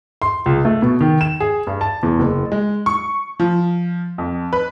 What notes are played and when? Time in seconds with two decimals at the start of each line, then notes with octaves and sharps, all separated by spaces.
0.22 C6
0.46 C#2
0.65 A3
0.82 B2
1.01 D#3
1.21 E7
1.40 G#4
1.67 G2
1.81 A5
2.03 E2
2.19 F#1
2.52 G#3
2.86 C#6
3.39 F3
4.18 F2
4.53 B4